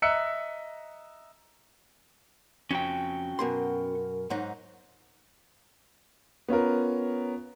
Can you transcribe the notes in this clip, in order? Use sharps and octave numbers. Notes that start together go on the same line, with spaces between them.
D#5 E5 A#5 E6 F#6 C#7
F2 C#4 F#4 G5
F#2 B2 A#4 C6
G#2 F#3 D#4
B3 C#4 F4 A#4